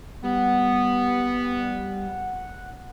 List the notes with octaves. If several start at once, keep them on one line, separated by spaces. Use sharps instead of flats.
G3 B3 F#5